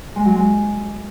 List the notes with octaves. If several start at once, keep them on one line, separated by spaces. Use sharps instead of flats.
G#3
F#3
G#3